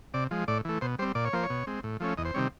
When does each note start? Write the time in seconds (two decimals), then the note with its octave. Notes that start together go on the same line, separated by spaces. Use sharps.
0.14 C3 D5
0.31 F3 G#3
0.48 A2 D5
0.65 E3 A3
0.81 B2 C5
0.99 G3 C5
1.02 C4
1.15 A#2 D5
1.25 C#5
1.33 F3 A#3 C5
1.43 C#5
1.50 B2
1.67 G#3 C4
1.84 A2
2.00 F3 A3 C#4
2.17 E2 D#5
2.25 C5
2.34 C3 D#3 G3 C4 C#5